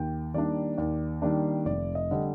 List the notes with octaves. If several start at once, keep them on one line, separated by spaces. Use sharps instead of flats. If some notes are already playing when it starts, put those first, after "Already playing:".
Already playing: D#2 G5
D#3 G3 A#3 D4 D5
D#2 D5
D#3 G3 A#3 D4
F1 D5
D#5
D3 G3